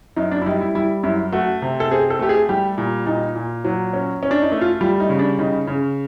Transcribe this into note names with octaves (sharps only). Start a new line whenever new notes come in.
F#2 D#4
D4
E4
G3 D#4
E4
G3 E4
F#2 E4
A3 F#4
C3
A4
C4 G#4
A4
A3 G4
G#4
G3 G4
A#2
A#2 D#4
A#2
F#3
C#4
C#4
D4
D#4
A3
F4
G3 F4
D#4
C#3
D4
C#3 D#4
C#3